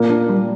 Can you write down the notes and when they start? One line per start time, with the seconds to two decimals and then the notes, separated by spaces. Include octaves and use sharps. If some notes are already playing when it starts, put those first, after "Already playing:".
Already playing: A#2 A#3
0.10 D4
0.29 G3